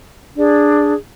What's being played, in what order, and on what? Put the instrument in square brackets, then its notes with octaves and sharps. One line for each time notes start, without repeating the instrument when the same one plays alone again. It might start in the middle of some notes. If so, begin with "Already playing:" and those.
[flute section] D4 G#4 D5